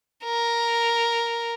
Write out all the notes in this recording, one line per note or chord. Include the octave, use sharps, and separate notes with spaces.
A#4